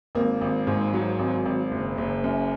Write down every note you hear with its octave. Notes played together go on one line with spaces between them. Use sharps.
G#1 A#3
G#1
G#2
F#3
G#1
G#1
F#1
F#1
F#2